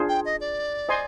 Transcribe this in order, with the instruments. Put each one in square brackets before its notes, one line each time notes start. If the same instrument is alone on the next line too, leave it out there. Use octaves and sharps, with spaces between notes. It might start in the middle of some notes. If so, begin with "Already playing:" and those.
Already playing: [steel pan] D4 F4 G#4 C5
[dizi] G5
D#5
D5
[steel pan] C5 D#5 G#5 C6